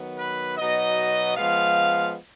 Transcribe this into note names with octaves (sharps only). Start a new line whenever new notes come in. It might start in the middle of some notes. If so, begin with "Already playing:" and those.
Already playing: D#3 F#3 B3
B4
B2 F#3 B3 D#4 D#5
F3 G#3 B3 F5